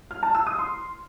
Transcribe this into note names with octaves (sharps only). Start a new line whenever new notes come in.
F6
A5
E6
D#6
C6